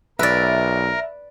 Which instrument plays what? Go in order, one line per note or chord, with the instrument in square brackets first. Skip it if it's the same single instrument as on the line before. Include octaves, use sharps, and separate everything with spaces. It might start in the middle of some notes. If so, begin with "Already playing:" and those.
[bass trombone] B1 [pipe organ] A#4 [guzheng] B4 D5 [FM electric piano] E5